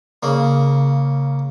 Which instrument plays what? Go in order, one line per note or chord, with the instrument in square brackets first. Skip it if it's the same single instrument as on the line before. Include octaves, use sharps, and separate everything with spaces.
[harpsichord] C#3 A#3